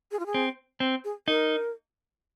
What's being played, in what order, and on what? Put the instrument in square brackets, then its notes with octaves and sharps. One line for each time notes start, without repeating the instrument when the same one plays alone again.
[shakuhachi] G#4
F4
G#4
[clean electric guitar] C4
C4
[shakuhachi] G#4
[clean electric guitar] D#4 [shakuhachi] A#4